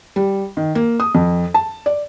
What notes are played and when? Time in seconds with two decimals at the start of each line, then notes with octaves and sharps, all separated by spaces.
0.16 G3
0.57 D#3
0.75 A#3
1.00 D#6
1.15 F2
1.54 A5
1.86 D5